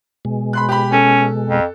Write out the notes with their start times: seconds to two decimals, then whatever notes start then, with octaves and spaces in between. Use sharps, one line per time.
0.25 B2 G#3
0.53 B5 C6 F#6
0.69 G4 B5
0.92 C#4 A4
1.48 F2